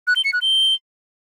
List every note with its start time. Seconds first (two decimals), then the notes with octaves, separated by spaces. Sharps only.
0.07 F#6
0.16 G7
0.24 C#7
0.33 F#6
0.42 G7